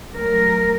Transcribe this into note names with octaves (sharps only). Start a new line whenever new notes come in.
F#3 A3 A#4